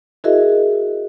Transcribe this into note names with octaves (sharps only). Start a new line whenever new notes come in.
E4 F#4 G#4 A#4 D#5 E5